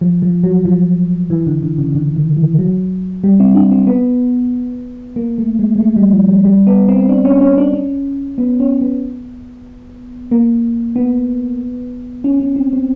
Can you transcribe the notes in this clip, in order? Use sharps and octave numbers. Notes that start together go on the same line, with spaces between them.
F3
F3
F#3
F3
E3
D3
D3
C#3
D3
D#3
E3
F#3
G3
C4
D4
C4
B3
A#3
A3
G#3
G#3
A3
G3
F3
G3
G3
B3
C4
D4
C#4
C#4
D4
C#4
B3
C#4
B3
A#3
B3
C#4
C#4
C4
C4